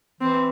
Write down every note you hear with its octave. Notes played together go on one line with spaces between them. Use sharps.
E3 C4